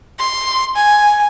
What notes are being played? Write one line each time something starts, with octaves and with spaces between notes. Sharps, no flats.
C6
G#5